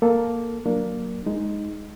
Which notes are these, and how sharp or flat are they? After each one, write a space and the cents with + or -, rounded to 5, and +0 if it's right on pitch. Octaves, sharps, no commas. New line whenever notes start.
A#3 +0 A4 +0
F#3 +0 A#3 +0 D4 +0
G#3 +0 D#4 +0